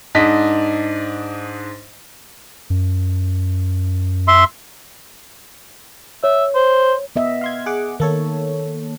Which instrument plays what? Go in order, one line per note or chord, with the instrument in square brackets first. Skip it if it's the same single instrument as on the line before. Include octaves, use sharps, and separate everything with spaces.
[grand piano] G#2 D4 D#5 B6
[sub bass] F#2
[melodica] E5 C6
[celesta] C#5 [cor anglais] E5
[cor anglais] C5
[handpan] B3 D#5 E5
[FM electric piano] F5 C6 G#6
G#4 F#5 D6
[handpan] D#3 [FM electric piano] A#3 A4 C#5